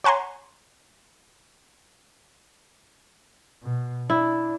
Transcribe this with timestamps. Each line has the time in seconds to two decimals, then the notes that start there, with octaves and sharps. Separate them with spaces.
0.04 C#5 F#5 G#5 A#5 C6
3.62 B2
4.10 D4 E4